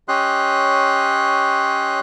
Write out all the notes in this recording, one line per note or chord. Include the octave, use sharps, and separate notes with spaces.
C#4 G4 C#5 D#5 C6 F#6